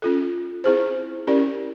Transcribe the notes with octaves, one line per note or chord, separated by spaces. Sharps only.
C#4 F4 A4
C4 E4 G#4 C5
C#4 E4 G4 A#4 D5